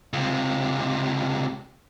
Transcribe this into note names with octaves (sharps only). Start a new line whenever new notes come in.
C#2 C3